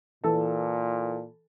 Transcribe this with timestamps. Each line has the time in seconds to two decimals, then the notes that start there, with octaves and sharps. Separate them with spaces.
0.24 A#2 E3 A4 A5